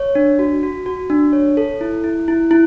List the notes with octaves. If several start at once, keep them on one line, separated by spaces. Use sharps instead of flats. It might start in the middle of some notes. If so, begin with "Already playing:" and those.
Already playing: C#5
D4
F#4
F#4
F#4
D4
C#5
A4
E4
E4
E4
E4